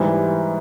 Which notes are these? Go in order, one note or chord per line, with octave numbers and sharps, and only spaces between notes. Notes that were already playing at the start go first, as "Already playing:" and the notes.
Already playing: G#2 E3 G3